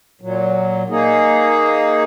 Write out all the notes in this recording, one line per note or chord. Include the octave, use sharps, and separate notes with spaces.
A#2 F#3
A#3 D#4 G#4